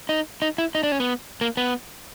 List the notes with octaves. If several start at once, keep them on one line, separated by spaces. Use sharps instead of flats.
D#4
D#4
E4
D#4
D4
C#4
B3
A#3
B3